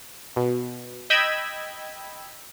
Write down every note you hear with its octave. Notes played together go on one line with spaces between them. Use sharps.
B2
D#5 G5 B5 E6 G#6